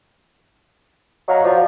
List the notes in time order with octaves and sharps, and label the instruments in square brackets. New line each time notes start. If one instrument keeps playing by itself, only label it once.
[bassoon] F#3 [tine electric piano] D#5 F5 A#5
[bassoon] F3 [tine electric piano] F#4 D5